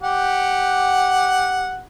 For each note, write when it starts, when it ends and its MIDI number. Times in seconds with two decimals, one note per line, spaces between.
0.02 1.81 67
0.02 1.81 78